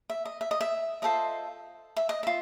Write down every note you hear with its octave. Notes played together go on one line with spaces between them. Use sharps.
E5
D#5
E5
D#5
E5
F4 A4 C5 D#5 E5
E5
D#5
F4 E5